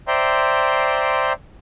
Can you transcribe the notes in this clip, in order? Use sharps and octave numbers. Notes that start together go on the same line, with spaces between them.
C5 D5 E5 G5 A#5 C6